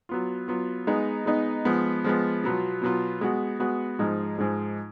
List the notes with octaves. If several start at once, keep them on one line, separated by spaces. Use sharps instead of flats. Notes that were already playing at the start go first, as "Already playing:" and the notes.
F#3 B3 F4
F#3 B3 F4
G#3 B3 D#4
G#3 B3 D#4
F3 G#3 B3
F3 G#3 B3
B2 F#3 B3 F4
B2 F#3 B3 F4
G#3 B3 F#4
G#3 B3 F#4
G#2 F3 G#3 D#4
G#2 F3 G#3 D#4